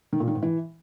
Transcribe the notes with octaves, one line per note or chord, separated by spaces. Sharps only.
D#3
A#2
D#3
G#2
E3